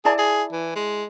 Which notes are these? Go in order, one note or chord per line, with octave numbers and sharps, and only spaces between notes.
E4 G#4 D5 A5
G#4
E3
G#3